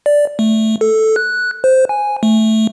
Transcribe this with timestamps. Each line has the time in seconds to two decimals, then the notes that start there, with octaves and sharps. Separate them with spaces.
0.06 D5
0.39 A3
0.81 A4
1.16 F#6
1.64 C5
1.89 G#5
2.23 A3